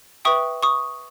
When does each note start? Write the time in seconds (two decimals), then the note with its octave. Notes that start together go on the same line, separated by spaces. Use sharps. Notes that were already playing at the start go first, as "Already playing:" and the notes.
0.25 B4 E5 G5 C#6 D#6
0.63 C#6 D#6